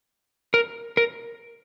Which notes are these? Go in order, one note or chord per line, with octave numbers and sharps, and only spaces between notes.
A#4
A#4